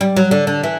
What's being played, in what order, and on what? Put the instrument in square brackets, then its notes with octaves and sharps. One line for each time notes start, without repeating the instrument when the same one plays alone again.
[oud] G3
F#3
D3
D3
E3